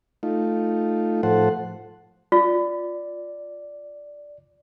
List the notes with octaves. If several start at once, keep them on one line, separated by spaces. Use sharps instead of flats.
A3 D#4 F4
A2 F3 A4 C5 F#5
F4 D5